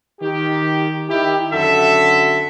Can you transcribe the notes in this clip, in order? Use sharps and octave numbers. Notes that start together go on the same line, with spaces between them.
D#3 G4
D#3 E4 G4
F#2 D3 F#4 A4 E5